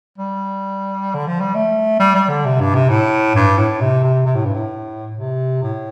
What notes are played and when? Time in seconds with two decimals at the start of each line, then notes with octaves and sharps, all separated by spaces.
0.18 G3
1.14 D3
1.27 F3
1.41 G3
1.55 A3
1.99 G3
2.15 G3
2.29 D3
2.45 C3
2.60 G2
2.75 C3
2.90 A2
3.35 G2
3.58 A2
3.81 C3
4.04 C3
4.26 C3
4.35 A2
4.45 G2
4.55 A2
5.17 C3
5.62 A2